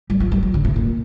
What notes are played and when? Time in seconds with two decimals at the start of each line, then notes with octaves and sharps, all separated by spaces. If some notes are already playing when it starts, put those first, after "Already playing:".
0.10 G3
0.20 F3
0.32 G3
0.43 F3
0.54 D3
0.65 C3
0.76 A#2